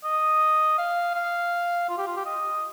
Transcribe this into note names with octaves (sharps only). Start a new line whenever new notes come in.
D#5
F5
F5
F4
G4
F4
G4
D#5